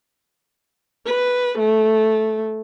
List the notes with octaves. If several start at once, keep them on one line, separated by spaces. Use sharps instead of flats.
B4
A3